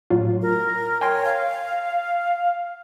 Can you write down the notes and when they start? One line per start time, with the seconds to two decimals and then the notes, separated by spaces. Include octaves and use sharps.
0.10 A2 F#3 F4
0.42 A#4
1.01 C#5 G5 G#5 C6
1.25 F5